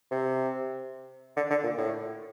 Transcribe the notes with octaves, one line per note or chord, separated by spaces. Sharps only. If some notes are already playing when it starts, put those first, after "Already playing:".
C3
D3
D3
A#2
A2